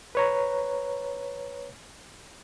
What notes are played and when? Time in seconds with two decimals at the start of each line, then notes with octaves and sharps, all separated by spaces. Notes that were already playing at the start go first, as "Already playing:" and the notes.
0.15 B4 C#5 A#5